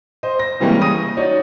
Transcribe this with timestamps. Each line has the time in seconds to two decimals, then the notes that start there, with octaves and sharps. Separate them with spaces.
0.23 C5 D#5
0.39 A#6
0.60 C3 E3 G3 G#3 A#3 C#4
0.82 D#6 A#6 D#7
1.17 D#4 F#4 C#5 D5